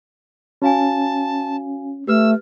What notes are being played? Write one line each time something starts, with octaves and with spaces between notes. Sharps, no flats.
C#4 F#4 F5 G#5 A5
A3 G4 B4 E6 F6